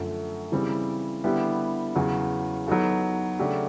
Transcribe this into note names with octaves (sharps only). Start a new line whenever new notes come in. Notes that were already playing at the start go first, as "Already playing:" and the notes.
Already playing: F#2 D3 F3 A3
C#3 E3 G3 C4
D3 G3 B3 E4 G4
E2 C#3 F#3
F#3 B3 D#4 F#4 A4
C#3 F#3 A3 D4 G4